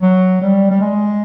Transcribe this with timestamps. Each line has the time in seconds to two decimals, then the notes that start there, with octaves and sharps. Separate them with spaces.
0.02 F#3
0.42 G3
0.71 G3
0.81 G#3